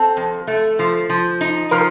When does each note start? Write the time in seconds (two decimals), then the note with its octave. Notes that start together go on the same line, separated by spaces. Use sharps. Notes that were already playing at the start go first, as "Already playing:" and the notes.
Already playing: C4 A4
0.17 F2
0.47 A3
0.79 F3
1.10 F3
1.41 D#4
1.71 F3 A#4